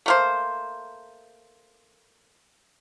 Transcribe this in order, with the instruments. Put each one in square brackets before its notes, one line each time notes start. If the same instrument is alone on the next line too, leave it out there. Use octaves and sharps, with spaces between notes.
[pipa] A3 A#3 C5